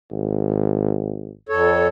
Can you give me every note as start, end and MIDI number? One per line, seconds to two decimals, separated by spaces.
0.12 1.32 32
1.49 1.87 41
1.49 1.87 69
1.49 1.87 73